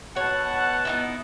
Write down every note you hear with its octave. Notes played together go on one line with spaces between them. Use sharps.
B2 C#5 F#5 A5
B3 D#4 E4